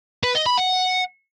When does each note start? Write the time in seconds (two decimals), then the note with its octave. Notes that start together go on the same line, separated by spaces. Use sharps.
0.23 B4
0.35 D#5
0.46 B5
0.57 F#5